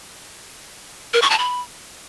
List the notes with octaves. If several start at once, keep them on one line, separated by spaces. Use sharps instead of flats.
A#4
C#6
A5
B5